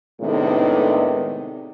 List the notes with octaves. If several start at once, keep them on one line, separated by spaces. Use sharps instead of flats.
A2 C3 D#3 G#3 B3 D4